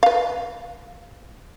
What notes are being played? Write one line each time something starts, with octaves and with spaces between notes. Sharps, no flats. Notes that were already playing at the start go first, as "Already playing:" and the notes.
B4 F5